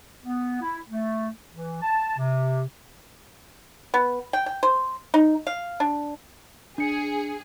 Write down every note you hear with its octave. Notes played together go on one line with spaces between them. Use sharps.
B3
E4
A3
E3
A5
C3
B3
G5
G5
C5
D#4
F5
D4
D4 G#4 C#7